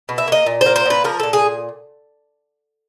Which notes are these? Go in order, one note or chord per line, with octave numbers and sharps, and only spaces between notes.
B2
E5
A#3 D#5
A#2
C5
A#3
C5
A#2 B4
F3 A#4
A#2 A4
G#4